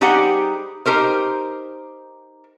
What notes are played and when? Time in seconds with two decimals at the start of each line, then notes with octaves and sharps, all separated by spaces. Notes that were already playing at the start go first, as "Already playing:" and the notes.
0.01 G3 D#4 G4 G#4 C5 F#5
0.86 D#4 G4 A#4 C5